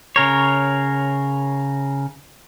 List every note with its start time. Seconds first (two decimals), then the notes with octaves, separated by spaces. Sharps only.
0.16 C#3 A#4 C#5